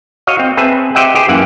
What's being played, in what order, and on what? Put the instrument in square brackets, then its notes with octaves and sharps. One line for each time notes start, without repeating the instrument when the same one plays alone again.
[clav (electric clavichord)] F#4 C#5 D#5 F5
C4
C4 G#4 B4 E5 A5
G4 C5 D#5 E5 F#5 G5
G4 G#4 C5
F#2 E3 A#3 G4 F#5